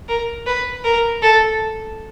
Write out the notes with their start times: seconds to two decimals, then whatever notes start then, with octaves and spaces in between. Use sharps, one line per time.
0.09 A#4
0.47 B4
0.84 A#4
1.23 A4